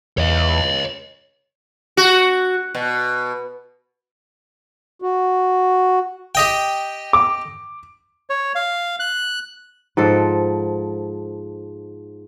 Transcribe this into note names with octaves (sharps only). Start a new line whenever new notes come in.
E2 C#5 D#5
F#4
B2
F#4
G4 D#5 G5
D6
C#5
F5
F#6
G#2 F3 A4